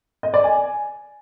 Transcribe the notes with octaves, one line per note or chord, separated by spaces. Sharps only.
D#5
D5
G#5